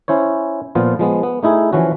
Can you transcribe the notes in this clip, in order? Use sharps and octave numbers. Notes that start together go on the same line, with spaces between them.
C#4 E4 C5 C#5
A#2 F3 B3 F4
F3 G#3 B3
B3
A3 D#4 E4 G#4
E3 F3 C#4 F#4